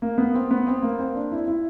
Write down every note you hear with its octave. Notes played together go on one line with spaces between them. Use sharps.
A#3
B3
C4
B3
C4
A#3
C4
D4
E4
E4